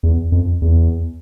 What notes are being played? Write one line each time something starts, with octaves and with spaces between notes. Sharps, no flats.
E2
F2
E2